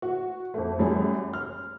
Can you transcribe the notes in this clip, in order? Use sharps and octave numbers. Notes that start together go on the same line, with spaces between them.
F#4
F2 A3
F#2 G3 G#4
F6